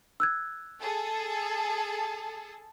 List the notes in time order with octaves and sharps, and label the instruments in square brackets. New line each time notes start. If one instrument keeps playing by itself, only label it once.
[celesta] E6 F#6 G#6
[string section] G#4 A4 A5